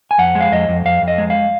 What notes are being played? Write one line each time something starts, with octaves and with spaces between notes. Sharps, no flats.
G#5
F2 F#5
G#3
F5
F2 D#5
F2
F2 F5
F2
D#5
G#3
F5